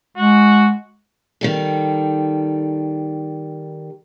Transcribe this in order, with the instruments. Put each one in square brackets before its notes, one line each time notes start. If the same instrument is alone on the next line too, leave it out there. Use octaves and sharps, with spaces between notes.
[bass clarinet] G#3 [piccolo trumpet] F#4
[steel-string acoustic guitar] D#3 G3 A4